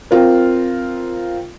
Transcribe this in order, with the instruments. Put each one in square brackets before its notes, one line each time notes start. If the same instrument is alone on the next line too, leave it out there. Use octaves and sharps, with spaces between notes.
[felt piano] C4 F4 A#4